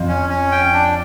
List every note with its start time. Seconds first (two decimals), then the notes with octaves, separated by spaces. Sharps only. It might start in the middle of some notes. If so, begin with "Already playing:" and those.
Already playing: F2
0.08 C#4
0.29 C#4
0.52 G5
0.73 D4